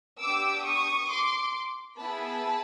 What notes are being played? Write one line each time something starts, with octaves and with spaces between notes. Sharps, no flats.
B3 D4 G4 D6 E6
C#6 D#6
C6 D6
B3 E4 G#4 A5 B5